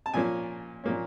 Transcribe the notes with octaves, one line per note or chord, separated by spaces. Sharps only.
A5
A#2 F3 A#3 C#4 G#5
A#2 F3 A#3 C#4